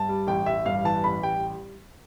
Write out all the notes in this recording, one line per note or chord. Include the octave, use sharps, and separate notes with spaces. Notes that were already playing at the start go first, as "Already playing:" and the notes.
Already playing: G2 A5
G3
A1 G5
A1 E5
G2 F5
E3 A5
A1 B5
G3 G5